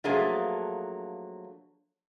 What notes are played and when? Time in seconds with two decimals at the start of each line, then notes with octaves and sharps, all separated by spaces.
0.04 F3 F#3 A3 A#3 D4 G#4